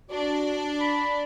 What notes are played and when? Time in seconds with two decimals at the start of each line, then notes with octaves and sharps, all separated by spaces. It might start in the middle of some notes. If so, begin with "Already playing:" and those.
0.11 D4 F#4 D5
0.80 B5